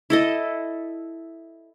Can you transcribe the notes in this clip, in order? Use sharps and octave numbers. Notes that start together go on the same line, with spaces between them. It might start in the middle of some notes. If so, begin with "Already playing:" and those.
E4 A4 D#5